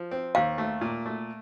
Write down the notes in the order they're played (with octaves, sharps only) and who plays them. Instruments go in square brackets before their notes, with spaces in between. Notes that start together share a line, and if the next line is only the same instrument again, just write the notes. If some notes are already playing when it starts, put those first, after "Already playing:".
Already playing: [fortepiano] F3
C4
[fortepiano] D#2 [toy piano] F5
[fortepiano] A3
A#2
A3